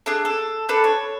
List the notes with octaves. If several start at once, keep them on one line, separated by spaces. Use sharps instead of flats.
D4 G#4 A4
A4
D4 A4 B4
C#5